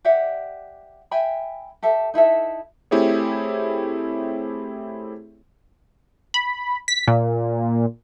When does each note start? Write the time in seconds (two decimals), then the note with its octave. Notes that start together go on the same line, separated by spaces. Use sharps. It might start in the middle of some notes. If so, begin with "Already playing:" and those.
0.05 G4 D5 E5 F#5
1.11 E5 G5 G#5 B5
1.83 G4 A4 E5
2.14 D#4 E4 A4 E5
2.91 A3 C4 E4 G4 G#4 C#5
6.34 B5
6.88 B6
7.08 A#2